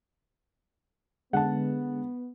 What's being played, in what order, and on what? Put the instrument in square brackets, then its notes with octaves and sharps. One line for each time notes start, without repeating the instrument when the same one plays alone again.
[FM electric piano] D3 G#3 [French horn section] B3 [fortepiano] F#5 A5